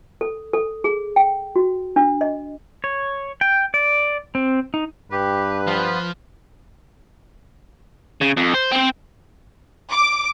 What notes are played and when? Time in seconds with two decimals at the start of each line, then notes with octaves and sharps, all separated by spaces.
0.21 A4
0.53 A4
0.84 G#4
1.16 G5
1.56 F#4
1.96 D4
2.21 D#5
2.84 C#5
3.41 G5
3.74 D5
4.35 C4
4.74 D#4
5.12 G2 G4 B4
5.67 F3 B3 F4
8.21 C#3
8.37 F2
8.54 C5
8.72 C4 C5
9.90 D6